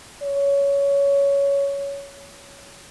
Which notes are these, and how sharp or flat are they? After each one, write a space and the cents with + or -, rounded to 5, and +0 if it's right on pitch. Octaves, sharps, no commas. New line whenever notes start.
C#5 +15